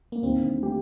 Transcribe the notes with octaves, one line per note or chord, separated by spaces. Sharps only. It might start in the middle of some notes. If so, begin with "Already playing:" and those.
A#3
D#2 C4
D3
A3
G4